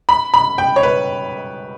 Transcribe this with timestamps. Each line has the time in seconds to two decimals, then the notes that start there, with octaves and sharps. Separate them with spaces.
0.09 B5
0.34 B5
0.58 G5
0.76 C#5
0.83 B4